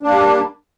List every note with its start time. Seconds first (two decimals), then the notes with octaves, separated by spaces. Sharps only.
0.03 D4
0.07 A#3
0.10 G3